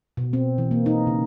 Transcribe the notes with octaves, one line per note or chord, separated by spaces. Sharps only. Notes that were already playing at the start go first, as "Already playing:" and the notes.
B2
C4
E3
A#3
D#4
C#3